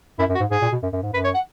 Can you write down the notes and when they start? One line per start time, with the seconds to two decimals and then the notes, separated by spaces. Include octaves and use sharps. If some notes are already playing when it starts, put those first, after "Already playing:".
0.19 F#2 E4
0.29 F#2
0.35 F#4
0.40 G#2
0.51 G#2 G#4
0.62 A#2
0.72 B2
0.83 F#2
0.93 F#2
1.03 G#2
1.13 F#2 B4
1.24 C#5
1.35 F#5